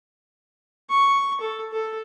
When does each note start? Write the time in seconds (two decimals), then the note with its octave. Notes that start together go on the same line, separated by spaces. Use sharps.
0.89 C#6
1.41 A4
1.73 A4